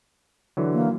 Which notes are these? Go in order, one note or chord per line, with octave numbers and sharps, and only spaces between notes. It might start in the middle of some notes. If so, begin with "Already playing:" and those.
D3 E3 F#3
A#3